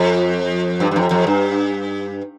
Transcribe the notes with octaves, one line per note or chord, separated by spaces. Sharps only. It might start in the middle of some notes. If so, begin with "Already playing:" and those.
Already playing: F2
G2
G2
F2
F2
G2